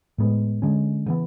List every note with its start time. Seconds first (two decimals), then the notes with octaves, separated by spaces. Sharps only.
0.18 A2 G#3 B3
0.62 D3 G#3 C#4
1.06 C#3 E3 B3